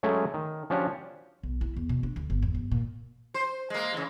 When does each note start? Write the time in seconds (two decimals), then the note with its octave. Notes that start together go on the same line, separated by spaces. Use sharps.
0.03 F#3 G#3 A3 C#4 G#4
0.34 D#3
0.70 F3 C#4 D4 F#4 G4 C#5
1.43 B1
1.61 E4
1.77 E2
1.89 B2
2.03 D4
2.16 D2
2.30 G1
2.42 E2
2.55 G1
2.71 A#2
3.34 C5
3.70 G#3 A#3
3.93 C#3 E3